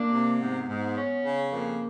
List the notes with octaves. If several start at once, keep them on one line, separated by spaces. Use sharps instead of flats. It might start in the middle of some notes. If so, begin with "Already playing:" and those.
Already playing: A#3 D4
C3
G#2 B3
G#2
C#4
C#3
F2 A#3